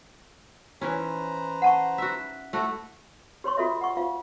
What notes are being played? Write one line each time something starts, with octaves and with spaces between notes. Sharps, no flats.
E3 C#4 B4 C5 A#5
F#5 A5 C#6
F#4 E5
A3 E4 F#4 A4 E5
G4 C#5 C6 C#6
F4 F#4 A4 D#5 E5
F#5 C#6
F4 F5